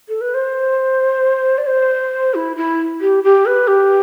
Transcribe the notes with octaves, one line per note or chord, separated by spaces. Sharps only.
A4
B4
C5
D5
C5
E4
E4
G4
G4
B4
G4